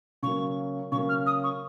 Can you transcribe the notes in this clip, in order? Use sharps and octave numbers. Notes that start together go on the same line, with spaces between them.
C#3 F#3 A#3 C#6
C#3 F#3 A#3 C#6
F6
D#6
C#6